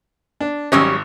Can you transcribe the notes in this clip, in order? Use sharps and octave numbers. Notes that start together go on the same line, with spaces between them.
D4
G#1 F#3 G3 C#4 D#6 E6